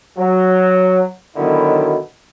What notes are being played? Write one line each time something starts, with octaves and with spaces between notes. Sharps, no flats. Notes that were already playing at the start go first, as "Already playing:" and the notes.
F#3
B1 B2 D3 D#3 F#3 E4